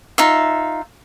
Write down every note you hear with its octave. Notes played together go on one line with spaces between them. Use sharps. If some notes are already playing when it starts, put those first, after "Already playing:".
D#4 F4 E5